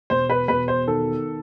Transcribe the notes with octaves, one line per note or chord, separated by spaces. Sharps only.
E1 C5
B4
E1 B4
C5
D#3 A4